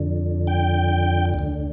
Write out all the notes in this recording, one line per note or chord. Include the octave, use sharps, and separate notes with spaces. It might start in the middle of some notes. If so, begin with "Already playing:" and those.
Already playing: F2 D3
G5
D2 D3